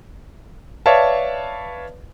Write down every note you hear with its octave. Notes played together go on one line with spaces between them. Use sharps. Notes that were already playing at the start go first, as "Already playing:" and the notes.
B4 C#5 D5 E5 F5 A5